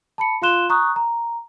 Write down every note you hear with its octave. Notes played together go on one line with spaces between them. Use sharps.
A5 B5 C#7
F4 F5 C6 F#6 E7 G7
A#5 C#6 D#6 F#6
A#5